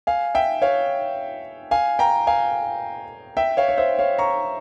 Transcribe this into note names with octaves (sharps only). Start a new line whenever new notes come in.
F5 G#5
E5 G5
C#5 F5
F5 G#5
G5 A#5
F5 G#5
E5 G5
C#5 F5
C#5
C5 E5
C#5 F5
A#5 C#6